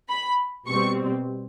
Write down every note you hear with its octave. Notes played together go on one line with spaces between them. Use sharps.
B5
B2 G3 C4 C#6